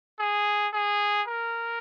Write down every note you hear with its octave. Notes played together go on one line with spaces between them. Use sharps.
G#4
G#4
A#4